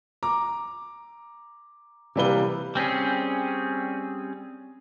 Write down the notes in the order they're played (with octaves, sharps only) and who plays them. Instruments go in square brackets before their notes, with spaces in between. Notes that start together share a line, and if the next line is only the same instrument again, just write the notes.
[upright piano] A#5 D6
C3 E3 G3 A#3 B4 G7
[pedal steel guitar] G3 C4 C#4 G#4